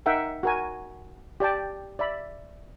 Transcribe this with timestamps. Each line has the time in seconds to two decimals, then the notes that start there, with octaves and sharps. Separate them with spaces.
0.06 D#4 A#4 E5 F#5 G5
0.43 F#4 A#4 G#5
1.40 G4 D5 G5 A5
1.99 D5 E5 B5